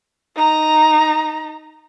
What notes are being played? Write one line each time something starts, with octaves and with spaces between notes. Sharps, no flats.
D#4 A#5